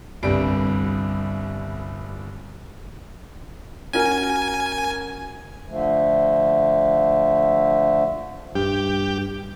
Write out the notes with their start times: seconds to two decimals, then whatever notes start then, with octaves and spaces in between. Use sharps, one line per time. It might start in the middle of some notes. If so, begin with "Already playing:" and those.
0.23 G1 C2 G3 D7
3.93 C#4 F#4 A#4 G#5
5.68 D3 F3 A3
8.55 G2 G4